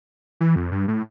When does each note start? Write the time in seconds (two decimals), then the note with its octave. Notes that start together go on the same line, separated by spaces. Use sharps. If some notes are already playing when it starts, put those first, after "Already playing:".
0.41 E3
0.56 F2
0.72 G2
0.88 A2